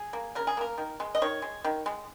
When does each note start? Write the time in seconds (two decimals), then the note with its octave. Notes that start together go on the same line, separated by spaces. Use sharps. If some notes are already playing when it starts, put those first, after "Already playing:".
Already playing: G#4
0.13 A#3
0.35 C#3 A#4
0.47 G#4
0.57 A#3 A#4
0.78 D#3
1.00 G#3
1.15 D#5
1.22 D#3 C#5
1.42 G#3
1.64 D#3
1.86 G#3